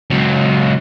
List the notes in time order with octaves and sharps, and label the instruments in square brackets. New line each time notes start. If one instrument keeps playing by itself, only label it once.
[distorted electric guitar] C#2 F#3